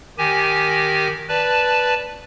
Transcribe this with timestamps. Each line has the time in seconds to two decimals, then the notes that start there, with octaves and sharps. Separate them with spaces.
0.18 D#3 G4 G#5
1.28 B4 D5 A5